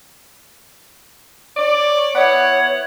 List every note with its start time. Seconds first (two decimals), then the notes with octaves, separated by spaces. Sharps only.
1.57 C#5 D5
2.14 B3 E4 C#5 F#5